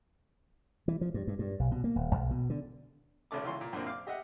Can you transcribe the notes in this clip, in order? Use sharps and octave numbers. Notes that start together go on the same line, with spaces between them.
E3
F3
G2
G2
G2
B1
B2
A#3
D#1
B1
B2
D3
G#1 C#3 A3 D6
C#2 E3 C6 C#6
A#2
F#2 A#2 D3 A#3 C4
F5 D6
G4 D#5 E5 F#5